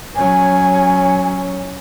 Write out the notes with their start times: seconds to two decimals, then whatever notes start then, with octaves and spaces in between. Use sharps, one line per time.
0.16 F#3 C#4 G#5